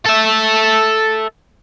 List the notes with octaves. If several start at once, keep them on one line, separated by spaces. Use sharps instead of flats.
A4 E5